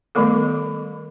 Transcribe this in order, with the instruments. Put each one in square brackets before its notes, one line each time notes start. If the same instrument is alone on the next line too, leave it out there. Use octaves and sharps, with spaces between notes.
[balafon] D#3 G3 A3 B3 A4